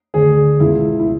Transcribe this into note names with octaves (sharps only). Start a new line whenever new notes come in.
D2 D3 G#4
C#2 B2 E4
E4